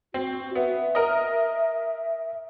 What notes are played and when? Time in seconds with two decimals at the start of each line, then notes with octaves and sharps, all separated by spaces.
0.14 C4 F#4
0.55 B3 E5
0.95 A#4 D#5